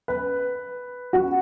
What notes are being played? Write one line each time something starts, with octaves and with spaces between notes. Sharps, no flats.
B4
F#4